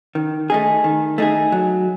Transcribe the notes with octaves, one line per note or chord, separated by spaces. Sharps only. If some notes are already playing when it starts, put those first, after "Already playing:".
D#3
A3 D#4 G#4
D#3
A3 D#4 G#4
F#3